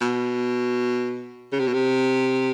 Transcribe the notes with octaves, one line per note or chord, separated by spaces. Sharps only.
B2
C#3
C3
B2
C3